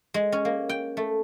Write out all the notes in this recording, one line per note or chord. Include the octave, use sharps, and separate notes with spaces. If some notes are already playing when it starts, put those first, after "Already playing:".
G#3
C#4
A#3
G5
A3